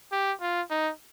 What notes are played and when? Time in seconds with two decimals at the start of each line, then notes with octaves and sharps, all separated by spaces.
0.12 G4
0.42 F4
0.71 D#4